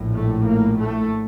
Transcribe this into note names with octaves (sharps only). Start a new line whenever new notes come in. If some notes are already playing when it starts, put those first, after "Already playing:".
Already playing: A#1 A2
A3
A#3
A3